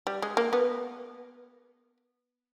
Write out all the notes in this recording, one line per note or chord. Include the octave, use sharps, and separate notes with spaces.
G3
G#3
A#3
B3